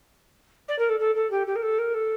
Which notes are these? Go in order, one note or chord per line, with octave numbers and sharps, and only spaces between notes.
D5
A#4
A4
A4
A4
G4
G4
A#4
A4
A#4
A4